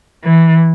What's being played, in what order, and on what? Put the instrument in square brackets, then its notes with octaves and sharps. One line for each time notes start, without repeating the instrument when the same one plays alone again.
[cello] E3